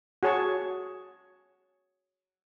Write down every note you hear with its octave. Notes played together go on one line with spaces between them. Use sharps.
F#4 G#4 C#5 A5 C#6